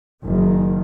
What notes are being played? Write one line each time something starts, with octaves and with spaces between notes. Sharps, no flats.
F#1 D#3